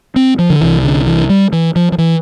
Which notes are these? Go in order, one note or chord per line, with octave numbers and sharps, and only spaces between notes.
C4
F3
D3
C2 C3 E3
D3
E3
G3
E3
F3
F3
E3